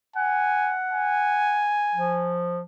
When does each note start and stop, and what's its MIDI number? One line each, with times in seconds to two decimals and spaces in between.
0.16 1.71 78
0.16 0.75 80
0.92 2.41 80
1.95 2.61 53